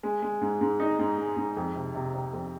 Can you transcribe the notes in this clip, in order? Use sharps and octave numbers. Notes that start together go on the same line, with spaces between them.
G#3
G#3
G#2
G#2
D#4
G#2
G#3
G#2
F2
C3
C3
C3
F2